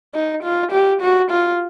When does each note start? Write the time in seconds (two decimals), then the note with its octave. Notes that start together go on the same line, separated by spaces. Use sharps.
0.14 D#4
0.43 F4
0.72 G4
1.01 F#4
1.31 F4